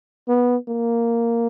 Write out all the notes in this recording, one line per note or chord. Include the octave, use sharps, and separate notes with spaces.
B3
A#3